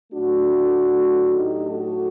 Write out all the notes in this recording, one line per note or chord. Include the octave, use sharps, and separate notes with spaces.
A2 F#3 A3 D4 F#4
D#4 G4
F#4 A4